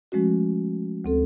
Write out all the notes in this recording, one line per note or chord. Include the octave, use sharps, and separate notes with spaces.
F3 G#3 A3 C#4 F#4
D2 C4 A4